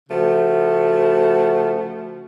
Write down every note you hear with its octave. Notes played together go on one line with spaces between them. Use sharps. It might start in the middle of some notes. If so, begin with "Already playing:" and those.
C#3 F3 A3 F#4